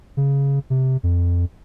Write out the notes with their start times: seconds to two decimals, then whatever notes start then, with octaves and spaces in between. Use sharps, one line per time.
0.17 C#3
0.70 C3
1.03 F2